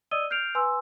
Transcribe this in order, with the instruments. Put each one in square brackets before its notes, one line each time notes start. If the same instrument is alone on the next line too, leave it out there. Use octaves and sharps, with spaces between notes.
[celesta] D5 D#5 D#6 E6 D#7 G7
F6 G6 C7 D7 F7
B4 G#5 C6 E6